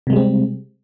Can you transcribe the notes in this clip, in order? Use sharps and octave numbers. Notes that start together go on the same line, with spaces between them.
C3 G3 G#3 C4